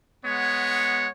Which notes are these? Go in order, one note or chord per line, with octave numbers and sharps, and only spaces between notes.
G#3 B3 C#5 F#5